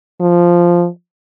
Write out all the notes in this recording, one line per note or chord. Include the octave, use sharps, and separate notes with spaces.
F3